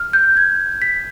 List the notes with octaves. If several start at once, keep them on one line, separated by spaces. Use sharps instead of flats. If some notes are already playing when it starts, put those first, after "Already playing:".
Already playing: F6
G6
G#6
B6